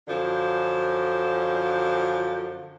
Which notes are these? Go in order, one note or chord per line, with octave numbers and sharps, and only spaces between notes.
F#2 D3 F3